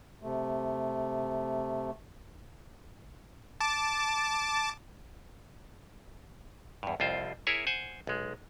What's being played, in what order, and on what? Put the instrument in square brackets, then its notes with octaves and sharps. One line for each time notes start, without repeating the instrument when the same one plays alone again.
[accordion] C3 A3
[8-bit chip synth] A5 D6
[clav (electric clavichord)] E2 G2
C2 F2 F4 C5
E4 G#4 A#4 C#5 E5
C5 F#5 G#5
B1 G#3